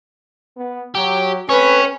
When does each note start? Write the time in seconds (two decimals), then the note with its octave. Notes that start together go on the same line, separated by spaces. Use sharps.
0.57 B3
0.95 F#3 G4
1.49 A3 C4 C#4 B4 C#5